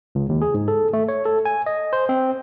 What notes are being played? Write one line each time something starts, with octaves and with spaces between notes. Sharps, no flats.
C#2
D#2
G#4
G#2
A4
A3
C#5
A4
G#5
D#5
C5
C4